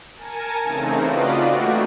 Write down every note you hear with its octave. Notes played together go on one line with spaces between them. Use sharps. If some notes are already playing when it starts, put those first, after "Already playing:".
A#4 G#5 A5 G#6 A#6 C#7
C#3 E3 A3 C4 D#4
F4 F#4 B4 D5 D#5
G3 A3 A#3 D4 F#4 G4